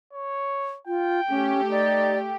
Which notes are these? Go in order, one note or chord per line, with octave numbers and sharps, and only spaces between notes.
C#5
F4 G5
A3 C#4 G4
D#4 D5